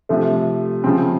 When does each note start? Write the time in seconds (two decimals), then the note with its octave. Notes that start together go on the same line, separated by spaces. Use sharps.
0.09 C3 F3 A3
0.84 C#3 F3 C4